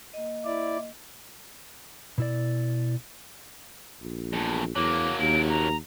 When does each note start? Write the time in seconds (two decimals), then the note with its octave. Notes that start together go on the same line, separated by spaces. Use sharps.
0.13 A#3 D#5
0.45 E4 D5
2.18 B2 E4 D5
4.01 A#1
4.33 E2 A2
4.76 E2 F#3 A#3 D6
5.20 D#2 D7
5.50 A#5